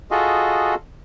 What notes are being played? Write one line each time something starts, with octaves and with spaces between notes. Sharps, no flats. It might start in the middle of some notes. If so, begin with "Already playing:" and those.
F4 F#4 G#4 A4 D#5